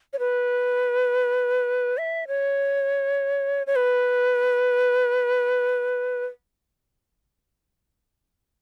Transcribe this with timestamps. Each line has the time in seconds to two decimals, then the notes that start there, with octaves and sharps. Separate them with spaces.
0.13 C#5
0.19 B4
1.98 E5
2.27 C#5
3.67 C#5
3.76 B4